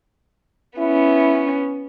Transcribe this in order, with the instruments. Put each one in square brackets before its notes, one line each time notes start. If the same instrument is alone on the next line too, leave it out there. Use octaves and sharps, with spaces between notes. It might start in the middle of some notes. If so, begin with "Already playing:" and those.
[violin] B3 C#4 [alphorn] E4